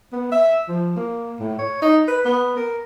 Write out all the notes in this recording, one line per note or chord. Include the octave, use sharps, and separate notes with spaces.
B3
E5
F3
A#3
A2
C#5
D#4
B4
B3
A#4